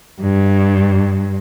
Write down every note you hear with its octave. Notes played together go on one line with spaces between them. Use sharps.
G2